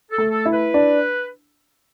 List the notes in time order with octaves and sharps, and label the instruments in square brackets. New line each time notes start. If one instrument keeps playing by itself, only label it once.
[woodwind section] A4
[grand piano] A3
[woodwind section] A4
[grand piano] E4
[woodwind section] B4
[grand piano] D4